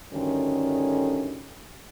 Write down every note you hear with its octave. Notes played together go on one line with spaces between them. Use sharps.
D2 G2 D3 D#3 C#4